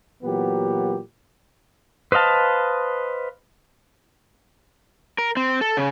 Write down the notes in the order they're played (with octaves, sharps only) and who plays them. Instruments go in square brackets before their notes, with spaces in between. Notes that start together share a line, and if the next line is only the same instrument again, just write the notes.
[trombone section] A#2 E3 F#3 B3 G4
[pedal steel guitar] B4 C5 D#5 F5 A5
[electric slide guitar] A#4
C4
A4
C#3